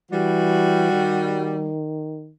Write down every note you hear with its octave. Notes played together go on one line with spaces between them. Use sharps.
E3 G3 F#4
D#3